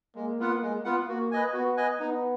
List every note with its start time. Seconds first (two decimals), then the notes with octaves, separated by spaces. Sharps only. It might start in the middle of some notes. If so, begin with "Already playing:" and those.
0.16 G#3 A#3
0.40 B3 F4 B4 F#5
0.63 G#3
0.85 B3 F4 B4 F#5
1.08 A#3 F#4
1.31 B4 D#5 G#5
1.53 B3 F#4
1.76 B4 D#5 G#5
2.00 B3 D#4